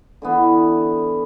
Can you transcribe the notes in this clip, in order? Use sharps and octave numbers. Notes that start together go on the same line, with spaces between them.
D3 E3 B3